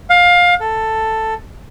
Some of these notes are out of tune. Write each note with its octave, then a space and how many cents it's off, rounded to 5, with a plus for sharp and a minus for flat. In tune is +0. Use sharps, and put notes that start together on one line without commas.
F5 +20
A4 +5